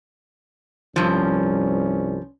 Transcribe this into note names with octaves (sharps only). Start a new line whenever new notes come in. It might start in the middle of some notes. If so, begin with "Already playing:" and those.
C2 G2 F3 C#4